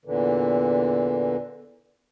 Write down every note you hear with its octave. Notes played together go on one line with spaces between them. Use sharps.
E2 A#2 D3 E3